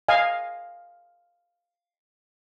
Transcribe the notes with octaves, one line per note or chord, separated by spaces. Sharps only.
D#5 F5 G#5